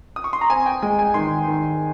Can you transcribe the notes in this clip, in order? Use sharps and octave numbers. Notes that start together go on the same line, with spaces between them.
D#6
C#6
C6
A#5
C4 G#5
G5
G#3 G#5
G#5
D#3 C6
D#3